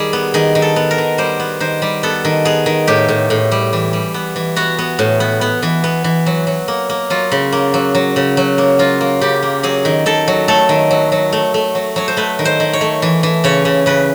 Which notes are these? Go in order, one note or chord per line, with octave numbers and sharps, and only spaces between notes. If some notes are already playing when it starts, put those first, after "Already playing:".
Already playing: D#3 G3 G#4
B3
D#3 G#4
D#3
A4
B3
A#4
D#3
G3 C5
B3
D#3 C5
G3
B3 A4
D#3
B3 G#4
D#3
A2 G4
A2
A2
G3
E3
G3
B3
E3
B3 F#4
B3
A2
B3
B3
E3
B3
E3
F#3
F#3
A#3
A#3
F#3 F4
C#3
A#3
F#3
F#3
C#3
F#3
A#3
F#3 F4
A#3
C#3 G4
A#3
F#3 G#4
D#3
D#3 A4
F#3
A3 A4
D#3
F#3
F#3
A3
A3
F#3
F#3 C#5
C5
A3 B4
D#3
C5
D#3
C#5
A3
E3
E3
C#3 C#5
C#3
C#3 B4